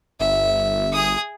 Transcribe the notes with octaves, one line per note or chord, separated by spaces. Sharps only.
G1 E5
G#4 D#6